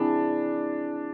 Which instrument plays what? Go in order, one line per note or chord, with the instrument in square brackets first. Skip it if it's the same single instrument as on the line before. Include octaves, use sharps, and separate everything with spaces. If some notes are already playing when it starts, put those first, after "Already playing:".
Already playing: [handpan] C4 E4 G#4 [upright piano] D4